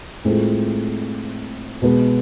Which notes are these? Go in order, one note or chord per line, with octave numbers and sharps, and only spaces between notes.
A2 G#3 C4 F4 A4
B2 G#3 B3